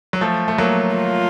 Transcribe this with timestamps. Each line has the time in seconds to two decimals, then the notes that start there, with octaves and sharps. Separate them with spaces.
0.13 F#3
0.21 F3 A3
0.48 A3
0.58 F#3 A#3
0.96 F4